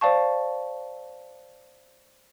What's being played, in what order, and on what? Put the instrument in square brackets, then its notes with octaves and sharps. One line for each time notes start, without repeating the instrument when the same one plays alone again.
[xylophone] C5 D5 F5 A5 C#6